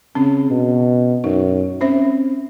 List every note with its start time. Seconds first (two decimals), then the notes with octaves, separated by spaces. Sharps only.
0.15 C#3 C4 C#4
0.50 B2
1.24 F#2 D#4
1.81 C4 C#4 C5 E5